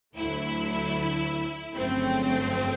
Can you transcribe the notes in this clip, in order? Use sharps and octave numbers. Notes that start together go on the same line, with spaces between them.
D2 D3 F#3 A3 E4
G1 F2 C#3 F#3 A3 C4